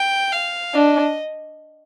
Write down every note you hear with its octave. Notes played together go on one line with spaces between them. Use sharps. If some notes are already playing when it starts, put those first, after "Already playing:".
Already playing: G5
F5
D4 D#5